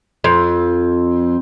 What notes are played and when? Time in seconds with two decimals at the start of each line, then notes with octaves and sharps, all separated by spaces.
0.24 F2